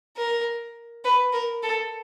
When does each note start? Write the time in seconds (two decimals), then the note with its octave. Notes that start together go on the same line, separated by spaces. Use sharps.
0.17 A#4
1.04 B4
1.33 A#4
1.63 A4